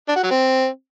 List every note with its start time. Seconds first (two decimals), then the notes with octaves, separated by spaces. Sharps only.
0.09 D4
0.16 F#4
0.23 F#3
0.31 C4